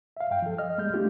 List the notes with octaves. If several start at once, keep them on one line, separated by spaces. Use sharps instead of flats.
E5 F5
G2 F5 G5
F3 A4
D#5 F6
G3 G#3 F6 G6
A3 A#3 D4 F4 G4